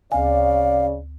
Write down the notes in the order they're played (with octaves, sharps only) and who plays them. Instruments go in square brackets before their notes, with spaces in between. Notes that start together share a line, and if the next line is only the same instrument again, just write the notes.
[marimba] D2 G#5 [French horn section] C#3 D5 [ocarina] F5